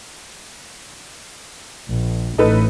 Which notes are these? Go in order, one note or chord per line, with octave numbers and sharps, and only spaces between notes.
A#1
A1 D#4 A4 B4